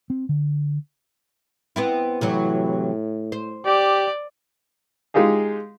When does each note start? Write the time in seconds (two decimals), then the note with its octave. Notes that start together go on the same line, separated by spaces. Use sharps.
0.10 C4
0.29 D3
1.76 B3 C4 E4
2.21 A2 C3 E3 F#3
3.32 C5
3.66 G4 D5
5.14 G#3 D#4 F4 G4 G#4